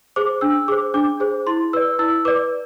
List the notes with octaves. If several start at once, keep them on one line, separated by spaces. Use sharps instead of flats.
G#4 C5 D6
D4 E6
G#4 C5 D6
D4 D6
G#4 C5
E4 C6
B4 D5 E6
E4 E6
B4 D5 D6